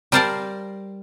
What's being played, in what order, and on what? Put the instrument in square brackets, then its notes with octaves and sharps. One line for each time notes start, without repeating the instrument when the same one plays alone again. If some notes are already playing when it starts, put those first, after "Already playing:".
[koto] G3 A#4 C5 D5 F5 A5